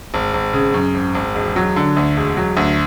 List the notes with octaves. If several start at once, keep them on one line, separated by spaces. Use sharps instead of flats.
G#1
G#1
C#3
F#2
G#1
G#1
E1
F#3
D3
D2
E1
F#3
D2